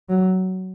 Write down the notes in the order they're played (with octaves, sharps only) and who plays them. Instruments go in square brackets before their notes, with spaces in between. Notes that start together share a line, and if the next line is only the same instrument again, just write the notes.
[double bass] F#3